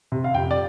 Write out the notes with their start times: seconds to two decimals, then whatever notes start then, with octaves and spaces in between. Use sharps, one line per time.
0.12 C3
0.24 F5
0.34 F2 G5
0.51 D5